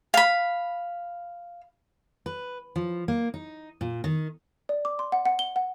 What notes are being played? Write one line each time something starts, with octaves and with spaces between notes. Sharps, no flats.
F5 B5
B4
F3
A#3
D#4
A#2
D#3
D5
D6
C6
F#5
F#5
G7
F#5